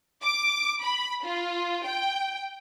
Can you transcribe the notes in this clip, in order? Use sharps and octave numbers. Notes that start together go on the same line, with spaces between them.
D6
B5
F4
G5